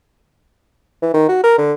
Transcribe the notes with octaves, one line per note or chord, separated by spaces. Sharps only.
E3
D#3
F#4
A#4
D3